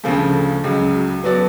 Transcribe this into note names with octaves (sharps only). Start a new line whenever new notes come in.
D2 C#3 F3 A3
C#2 C#3 F#3
F#3 B3 F#4 A4 D5